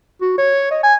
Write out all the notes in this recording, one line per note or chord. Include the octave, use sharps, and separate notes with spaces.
F#4
C#5
D#5
G#5